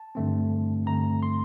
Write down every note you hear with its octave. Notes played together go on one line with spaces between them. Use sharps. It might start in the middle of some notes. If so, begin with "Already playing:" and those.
Already playing: A5
G2 D3 A3 C4
G2 D3 A3 C4 A#5
C6